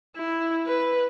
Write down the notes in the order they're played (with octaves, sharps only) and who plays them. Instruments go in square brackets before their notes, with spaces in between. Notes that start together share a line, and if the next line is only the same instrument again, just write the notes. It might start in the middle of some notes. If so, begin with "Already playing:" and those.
[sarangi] E4
B4